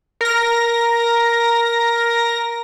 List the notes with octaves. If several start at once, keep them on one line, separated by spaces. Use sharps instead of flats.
A#4 A#6